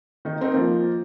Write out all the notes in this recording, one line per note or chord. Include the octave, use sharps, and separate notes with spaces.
D#3 D#4
C4 D#4 A#4
F3 A#3 C4